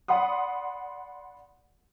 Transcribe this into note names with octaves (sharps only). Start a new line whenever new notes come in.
D5 F#5 B5 C6 D#6